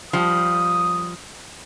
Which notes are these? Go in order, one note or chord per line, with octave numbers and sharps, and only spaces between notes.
F3 G3 D#6